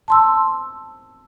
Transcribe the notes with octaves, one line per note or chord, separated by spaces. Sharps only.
A5 C6 E6